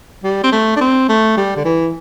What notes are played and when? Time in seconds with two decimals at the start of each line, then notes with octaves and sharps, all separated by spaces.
0.24 G3
0.44 C4
0.52 A3
0.76 D4
0.81 C4
1.09 A3
1.37 G3
1.56 D3
1.65 E3